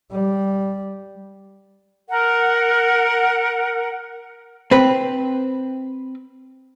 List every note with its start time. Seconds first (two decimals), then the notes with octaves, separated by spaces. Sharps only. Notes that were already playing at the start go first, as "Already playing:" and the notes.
0.12 G3
2.09 A#4 F#5
4.71 C4 B4